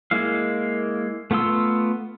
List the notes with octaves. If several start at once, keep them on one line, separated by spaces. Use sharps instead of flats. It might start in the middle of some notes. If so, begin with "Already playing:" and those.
G#3 A#3 E4 F5
A3 B3 F4 C6 E6